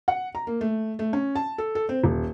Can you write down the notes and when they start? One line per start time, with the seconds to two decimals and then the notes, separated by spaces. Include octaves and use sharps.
0.08 F#5
0.35 A#5
0.47 A#3
0.61 A3
0.99 A3
1.13 C#4
1.35 A5
1.58 A4
1.75 A4
1.89 C4
2.04 D#1